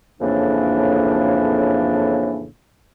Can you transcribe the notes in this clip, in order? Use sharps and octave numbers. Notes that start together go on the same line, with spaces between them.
F2 A2 C#3 E3 A#3 D4